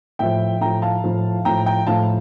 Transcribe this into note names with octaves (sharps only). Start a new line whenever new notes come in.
A2 F3 E5 G5
A2 F3 G5 A#5
F5 A5
A2 F3
A2 F3 G5 A#5
G5 A#5
A2 F3 F5 A5